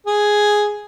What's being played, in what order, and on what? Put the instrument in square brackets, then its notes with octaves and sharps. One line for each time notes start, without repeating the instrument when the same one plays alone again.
[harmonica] G#4